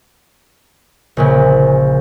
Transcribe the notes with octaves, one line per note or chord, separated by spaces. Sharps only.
A#1 A#2 C#3